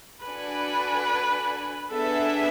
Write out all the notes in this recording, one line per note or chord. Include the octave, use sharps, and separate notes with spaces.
D4 F#4 A4 B4 D5 G#5
B3 D4 G#4 A4 B4 E5